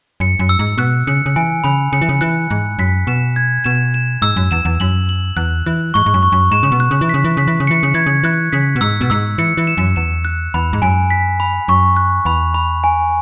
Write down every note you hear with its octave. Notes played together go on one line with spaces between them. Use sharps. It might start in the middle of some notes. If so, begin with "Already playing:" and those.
F#2 C#7
F#2
E6
G#2
B2 F#6
C#3 C#7
C#3
E3 G#5
C#3 B5
C#3 C#7
E3
C#3
E3 F#6
G#2 F#6
F#2 B6
B2 E7
G#6
B2 E7
E7
G#2 E6
F#2
E2 E7
E2
F#2 F#7
F#7
E2 F#6
E3 F#6
G#2 C#6
G#2
F#2
C#6
F#2
G#2 E7
C#3
B2
F#6
C#3
E3
C#3 B6
E3
C#3 B6
E3
C#3
E3 C#7
C#3
E3 G#6
C#3
E3 F#6
C#3 B6
B2
G#2 E6
B2
G#2 E6
E3 C#7
E3
E7
F#2
E2 E7
F#6
E2 B5
G#2
F#2 G#5
B6
B5
F#2 C#6
F#6
E2 B5
B5
G#5